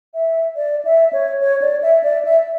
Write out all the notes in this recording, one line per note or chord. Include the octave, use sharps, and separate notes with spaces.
E5
D5
E5
C#5
C#5
D5
E5
D5
E5